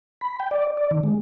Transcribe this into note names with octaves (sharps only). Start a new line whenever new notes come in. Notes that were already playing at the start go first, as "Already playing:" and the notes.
B5
G5
D5
D5
D#3
G#3